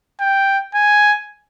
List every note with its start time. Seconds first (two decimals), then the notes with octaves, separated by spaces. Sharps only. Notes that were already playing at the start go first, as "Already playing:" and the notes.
0.21 G5
0.75 G#5